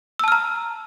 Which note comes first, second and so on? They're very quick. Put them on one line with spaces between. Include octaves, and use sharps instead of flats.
E6 A5 F6 A#5